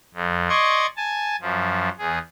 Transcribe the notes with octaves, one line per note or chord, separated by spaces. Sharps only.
F2
D5 D#5 C6 C#6 G#6
G#5 A5
F#2 F3
E2 G#4